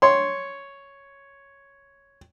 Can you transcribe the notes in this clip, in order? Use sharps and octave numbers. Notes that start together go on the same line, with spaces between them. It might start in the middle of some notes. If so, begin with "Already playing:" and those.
C#5 C6